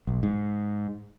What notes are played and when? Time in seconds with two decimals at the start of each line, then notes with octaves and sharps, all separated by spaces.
0.07 B1
0.23 G#2